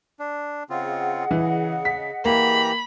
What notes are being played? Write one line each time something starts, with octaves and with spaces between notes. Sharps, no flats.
D4
C#3 C4 F4 G#4 D#5 F#5
C#3 E3
B6
E3 A#3 G4 A#5 B5